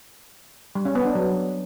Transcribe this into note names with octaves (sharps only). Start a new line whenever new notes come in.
G3
C#4
B3
D4
F#3